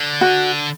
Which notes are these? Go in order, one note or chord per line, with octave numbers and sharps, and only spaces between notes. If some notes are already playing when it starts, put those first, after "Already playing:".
Already playing: D3
F#4